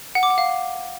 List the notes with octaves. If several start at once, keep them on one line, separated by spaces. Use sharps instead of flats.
F#5
D6
F#5
F5